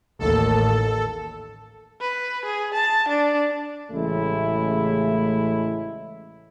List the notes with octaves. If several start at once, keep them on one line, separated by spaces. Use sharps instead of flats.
A1 D#2 A4
B4
G#4
A5
D4
A1 A2 C#3 G#3 A3 E4